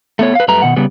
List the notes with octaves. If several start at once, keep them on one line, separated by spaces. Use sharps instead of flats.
A3 B3 C#5
B4 F5
F#2 G3 A3 B4 A#5
B2 D#3 F#5
C#3 G3 B3